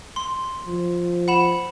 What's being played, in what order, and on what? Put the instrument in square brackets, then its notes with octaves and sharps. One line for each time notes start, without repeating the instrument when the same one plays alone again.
[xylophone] C6
[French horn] F3
[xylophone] F#5 B5 E7